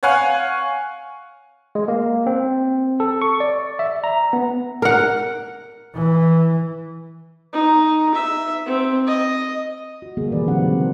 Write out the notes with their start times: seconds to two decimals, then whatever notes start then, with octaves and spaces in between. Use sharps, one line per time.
0.03 C#5 F5 F#5 G#5
1.75 G#3
1.88 A#3
2.27 C4
3.00 A4
3.22 C#6
3.40 D5
3.79 E5
4.04 A#5
4.33 B3
4.82 A#4 F#5
5.95 E3
7.53 D#4
8.15 E5
8.66 C4
9.07 D#5
10.02 F#4
10.17 D3 G3 A#3 B3 G#4
10.32 B2 D#3 E3 B4 D5
10.48 D3 F#3 C4 D4 F#5
10.63 C#3 G#3
10.78 A#4 C5